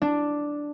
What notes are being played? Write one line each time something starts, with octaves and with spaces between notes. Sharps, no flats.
D4